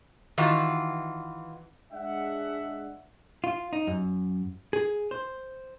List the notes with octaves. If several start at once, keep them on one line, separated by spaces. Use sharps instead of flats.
D#3 E3 F4 F#4
G#3 D4 E5 F#5
F4
D#4
F#2
G#4
C5